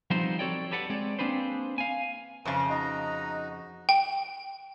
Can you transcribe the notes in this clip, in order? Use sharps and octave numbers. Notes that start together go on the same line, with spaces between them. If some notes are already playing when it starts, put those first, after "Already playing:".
F3 G3 B3 C4 D#4 C5
C4 F#4 A4 C#5 D5 G5
G4 A4 B4 D5 F#5
G#3 C4 C#5 D5
A#3 C4 D4 G#4 B4 C5
F5 G#5
F2 C#3 C#4 B4 C5 A#5 C#6
D#4 F#4 D#5 A#5
G5